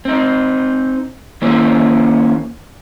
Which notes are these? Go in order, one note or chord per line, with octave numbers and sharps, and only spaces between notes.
C4 D#4
D#3 A#3 C#4 E4 C5